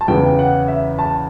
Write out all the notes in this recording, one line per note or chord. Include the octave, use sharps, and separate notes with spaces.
A5
E2 C#3 E3 B3 G5
F#5
E5
A5